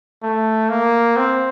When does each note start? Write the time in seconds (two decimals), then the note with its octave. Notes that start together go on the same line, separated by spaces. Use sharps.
0.23 A3
0.69 A#3
1.16 C4